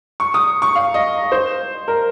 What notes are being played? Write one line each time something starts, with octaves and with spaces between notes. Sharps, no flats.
C#6
D#6
C#6
F5
D#5
C5
A#4